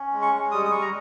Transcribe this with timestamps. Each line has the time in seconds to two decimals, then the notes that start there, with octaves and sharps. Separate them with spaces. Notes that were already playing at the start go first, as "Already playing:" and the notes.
Already playing: C#4
0.13 G#3
0.22 C#6
0.33 G#3
0.51 G3 D#6
0.65 D#6
0.71 G3 C#6
0.81 A#5